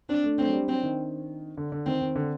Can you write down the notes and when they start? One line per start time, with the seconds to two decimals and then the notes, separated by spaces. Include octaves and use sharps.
0.09 C4 D4
0.24 A3
0.38 A3 C4
0.47 F#3
0.53 G3
0.68 F#3 C4
0.83 D#3
1.57 D3
1.72 D3
1.86 D#3 C4
2.02 D#3
2.16 D3